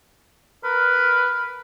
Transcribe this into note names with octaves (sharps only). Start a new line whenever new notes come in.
A#4 B4